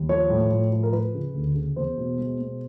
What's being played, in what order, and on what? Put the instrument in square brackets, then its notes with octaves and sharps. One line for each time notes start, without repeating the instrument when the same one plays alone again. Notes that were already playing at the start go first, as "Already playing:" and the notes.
Already playing: [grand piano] D#2
F3 C#5
A2
A2
F3
A#4
F3 B4
C#3
D2
C#3
E2 C5
B2
G#3
B2